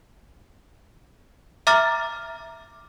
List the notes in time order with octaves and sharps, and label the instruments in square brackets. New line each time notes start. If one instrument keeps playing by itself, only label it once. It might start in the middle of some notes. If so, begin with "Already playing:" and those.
[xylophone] E5 A#5 D6 F6 A6